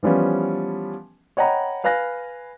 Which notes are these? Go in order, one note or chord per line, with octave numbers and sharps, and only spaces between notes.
E3 F3 G3 B3 C#4
C#5 D#5 F#5 G5 A#5 B5
B4 F5 G#5 F#6 A#6